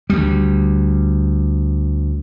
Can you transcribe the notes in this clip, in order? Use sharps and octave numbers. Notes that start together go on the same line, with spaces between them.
D2 G3